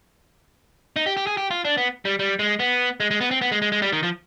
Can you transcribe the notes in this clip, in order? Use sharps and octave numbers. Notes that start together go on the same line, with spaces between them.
D#4
G4
G4
G#4
G4
F4
D4
B3
G3
G3
G#3
B3
G#3
G#3
B3
C4
B3
G#3
G#3
G#3
G3
D#3
F3